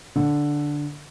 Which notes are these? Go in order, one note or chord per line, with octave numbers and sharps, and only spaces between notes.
D3